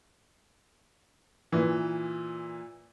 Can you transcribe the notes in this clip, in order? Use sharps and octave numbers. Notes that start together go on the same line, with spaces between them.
A#2 E3